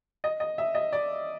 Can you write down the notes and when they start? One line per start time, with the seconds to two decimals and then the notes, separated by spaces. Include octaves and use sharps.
0.24 D#5
0.40 D#5
0.58 E5
0.75 D#5
0.93 D5